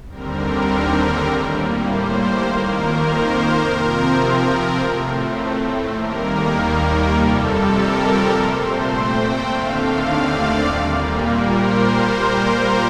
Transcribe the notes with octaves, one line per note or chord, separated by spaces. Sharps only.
D#2 D3 G3 C4 A#4
A2 G3 A#3
C5
F2 D#3 A#3 A#4
C5
C3 F3 C4 A#4
A#4
A2 A3 C4
D#2 D#3 G3 A#3 A#4
A#4
F2 C3 G3 A4
A#4
A#2 A3 C4 C5
G5
D#2 D3 A3 C4 F5
D5
A#2 G3 A#3
A#4
C5